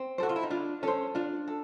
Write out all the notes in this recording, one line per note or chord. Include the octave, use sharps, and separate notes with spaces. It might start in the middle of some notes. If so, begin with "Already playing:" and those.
Already playing: C4
F#4 A4 C5
F4
E4
D#4
D4 F4
C#4 A4 C5
D4 F4
A4